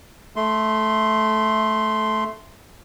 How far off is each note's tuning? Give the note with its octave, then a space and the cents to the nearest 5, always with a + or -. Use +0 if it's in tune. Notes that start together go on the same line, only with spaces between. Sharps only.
A3 -10 C6 +0